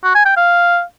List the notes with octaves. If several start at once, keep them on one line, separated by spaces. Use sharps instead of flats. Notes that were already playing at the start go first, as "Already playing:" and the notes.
F#4
G#5
G5
F5